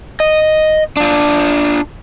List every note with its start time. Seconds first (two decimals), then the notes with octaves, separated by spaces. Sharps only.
0.20 D#5
0.97 D4 F4